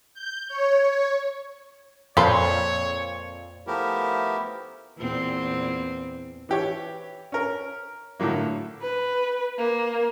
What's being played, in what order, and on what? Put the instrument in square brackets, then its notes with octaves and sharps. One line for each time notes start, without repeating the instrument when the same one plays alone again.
[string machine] G6
C#5
[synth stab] F2 A#2 [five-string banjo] C4 A4 [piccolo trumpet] C#5 [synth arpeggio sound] B5 C6
[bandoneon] F3 A3 B3 E4 G4 A#4
[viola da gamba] E2 A#2 C4
[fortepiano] E3 G4 C#5
C#4 A#4
A2 D3 F#3 A#3
[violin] B4
A#3